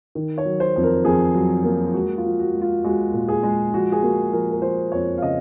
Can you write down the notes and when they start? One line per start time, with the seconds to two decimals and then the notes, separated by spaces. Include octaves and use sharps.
0.15 D#3
0.38 C#5
0.45 F#3
0.60 C5
0.76 F2
0.83 A#4
1.05 F2 G#4
1.34 F#3
1.64 A#3
1.88 F4
1.94 G#3 F#4
2.18 F4
2.25 F3
2.39 F#4
2.55 G#3
2.62 F4
2.84 G#3 F#4
3.14 A#2
3.28 G#4
3.43 G#3
3.74 F3 F#4
3.92 G#4
4.03 A#3 F#4
4.32 F3 A#4
4.51 A#4
4.62 F3 C5
4.92 F2 C#5
5.18 F5
5.22 C#3 D#5